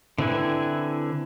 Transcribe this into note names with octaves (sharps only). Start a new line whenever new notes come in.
D3 C4 E4 B4 G#5